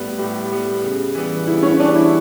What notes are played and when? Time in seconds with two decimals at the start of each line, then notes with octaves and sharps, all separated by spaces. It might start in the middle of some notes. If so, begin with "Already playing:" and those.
Already playing: A2 G3 B3
0.18 A2 G4
0.50 G3 B3
0.82 C#3
1.15 E3 G3 B3
1.47 C#3 E4
1.63 C#4
1.79 E3 G3 B3 D4
1.95 E4